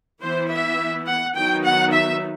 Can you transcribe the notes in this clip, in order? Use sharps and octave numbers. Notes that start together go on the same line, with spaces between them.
E3 B3 E4 C5
E5
F#5
D#3 F#3 B3 D#4 G5
F#5
E5